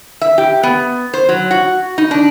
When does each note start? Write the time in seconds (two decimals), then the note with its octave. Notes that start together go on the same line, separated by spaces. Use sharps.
0.21 E5
0.38 G4
0.63 B3
1.14 C5
1.29 F#3
1.51 F#4
1.98 D#4
2.11 D4